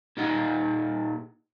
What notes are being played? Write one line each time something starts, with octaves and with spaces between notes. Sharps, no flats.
A#2 D#4 G4 D#5 F#5